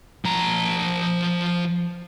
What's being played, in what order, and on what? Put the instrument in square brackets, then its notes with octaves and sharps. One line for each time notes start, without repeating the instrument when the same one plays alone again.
[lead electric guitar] F3 A#5